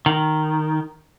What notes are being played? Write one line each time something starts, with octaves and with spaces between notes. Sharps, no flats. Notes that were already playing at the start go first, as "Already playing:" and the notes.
D#3